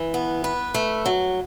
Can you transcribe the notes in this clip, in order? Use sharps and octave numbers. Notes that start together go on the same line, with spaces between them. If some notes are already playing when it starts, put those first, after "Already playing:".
Already playing: E3
B3
B4
A3
F#3